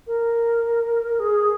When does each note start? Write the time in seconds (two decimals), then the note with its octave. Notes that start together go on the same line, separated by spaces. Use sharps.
0.07 A#4
1.20 G#4